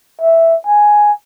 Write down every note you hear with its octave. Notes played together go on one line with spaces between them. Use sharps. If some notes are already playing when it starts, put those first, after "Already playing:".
E5
G#5